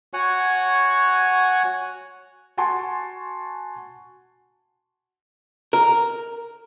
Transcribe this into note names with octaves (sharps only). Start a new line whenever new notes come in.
F#4 C#5 F#5 G#5
F#4 F#5 G#5 A5 C6 C#6
A#4